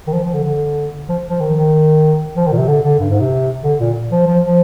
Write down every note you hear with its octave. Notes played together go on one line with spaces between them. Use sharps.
D#3
F3
F3
D3
D3
F3
F3
D#3
D#3
F3
D#3
A#2
C3
D3
D3
G2
G#2
C3
D3
A#2
F3
F3
F3